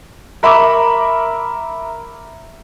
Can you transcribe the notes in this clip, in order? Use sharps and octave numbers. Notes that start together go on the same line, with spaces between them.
A#4 E5 B5 C#6 D6